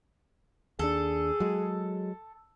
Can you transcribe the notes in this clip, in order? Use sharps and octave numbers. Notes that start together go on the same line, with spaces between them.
D#2 D4 G#4 A4
F#3 G#3